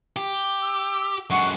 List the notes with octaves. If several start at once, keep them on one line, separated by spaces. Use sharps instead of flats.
G4
E6
F#2 G#3 F#5 C#6